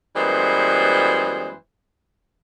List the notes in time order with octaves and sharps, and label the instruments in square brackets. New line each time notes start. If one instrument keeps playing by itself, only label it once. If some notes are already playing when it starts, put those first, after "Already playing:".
[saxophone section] F#2 E3 G3 G#3 B3 C5